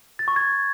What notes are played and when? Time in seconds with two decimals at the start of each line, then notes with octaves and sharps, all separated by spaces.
0.19 A6
0.28 C#6
0.36 G#6